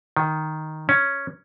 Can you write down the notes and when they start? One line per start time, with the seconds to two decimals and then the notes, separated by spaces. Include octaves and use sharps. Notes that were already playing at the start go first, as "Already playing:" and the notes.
0.17 D#3
0.89 C#4